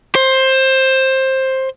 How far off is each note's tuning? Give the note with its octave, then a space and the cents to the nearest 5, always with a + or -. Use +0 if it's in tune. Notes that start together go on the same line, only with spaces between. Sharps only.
C5 +15